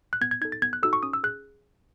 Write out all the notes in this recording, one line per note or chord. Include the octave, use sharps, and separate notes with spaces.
F#6
B3 G#6
G#6
D#4 A4 G#6
A6
B3 G#6
F#6
D#4 F#4 A4 E6
C#6
C#4 D#6
E6
G#4 F#6